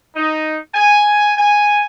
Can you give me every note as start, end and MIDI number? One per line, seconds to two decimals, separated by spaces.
0.15 0.57 63
0.74 1.31 80
1.37 1.83 80